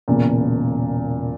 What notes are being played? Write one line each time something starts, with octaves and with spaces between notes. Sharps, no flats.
E1 E2 A#2 C#3